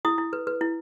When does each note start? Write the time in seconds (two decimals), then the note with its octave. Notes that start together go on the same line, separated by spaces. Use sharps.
0.05 E4 D#6
0.18 E4
0.33 B4
0.47 B4
0.61 E4